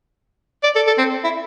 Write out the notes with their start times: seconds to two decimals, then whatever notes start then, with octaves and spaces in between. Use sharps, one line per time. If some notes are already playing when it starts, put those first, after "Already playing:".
0.63 D5
0.75 A4
0.87 A4
0.98 C4
1.24 E4